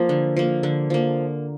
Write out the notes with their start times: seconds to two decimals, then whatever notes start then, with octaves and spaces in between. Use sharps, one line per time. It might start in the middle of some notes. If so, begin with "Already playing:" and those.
Already playing: F3 A#3
0.09 D3
0.36 F3 A#3
0.63 D3
0.90 F3 A#3